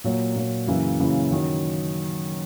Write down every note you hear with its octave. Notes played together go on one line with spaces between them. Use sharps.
A#2 F#3 A#3
A#2 F#3 A#3
F#2 C#3 E3 A#3 E4
F#2 C#3 E3 A#3 E4
F#2 D#3 F#3